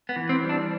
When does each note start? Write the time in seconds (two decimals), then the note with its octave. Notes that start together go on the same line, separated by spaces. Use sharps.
0.09 B3
0.16 E3
0.29 C4
0.44 G3
0.49 D4